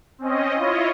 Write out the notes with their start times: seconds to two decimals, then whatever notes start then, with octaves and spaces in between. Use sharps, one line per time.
0.18 C4 C#4 D#5
0.55 E4 F4 C#5 D#5